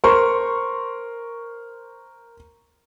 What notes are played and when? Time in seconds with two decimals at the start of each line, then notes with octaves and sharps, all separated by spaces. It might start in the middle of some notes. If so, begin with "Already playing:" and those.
0.04 A#4 C5 C6 C#6